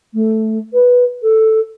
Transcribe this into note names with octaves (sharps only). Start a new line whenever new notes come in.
A3
B4
A4